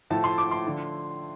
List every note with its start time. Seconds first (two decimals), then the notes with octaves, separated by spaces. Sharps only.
0.10 A2 F3 A3 A5
0.24 C6
0.38 D6
0.51 C6
0.66 D3 F3